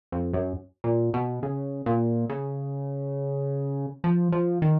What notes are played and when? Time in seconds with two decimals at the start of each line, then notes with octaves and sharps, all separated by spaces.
0.12 F2
0.33 F#2
0.84 A#2
1.14 B2
1.43 C#3
1.86 A#2
2.30 C#3
4.04 F3
4.32 F3
4.62 D#3